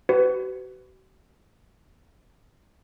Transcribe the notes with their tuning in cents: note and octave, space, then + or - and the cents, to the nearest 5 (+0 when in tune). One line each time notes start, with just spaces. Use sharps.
F#4 +45 B4 +30